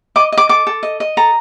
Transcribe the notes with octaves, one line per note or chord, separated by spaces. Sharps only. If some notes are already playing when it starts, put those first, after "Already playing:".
D#5 D6
D#5
D6
A4 D6
A4
D#5
D#5
A4 A#5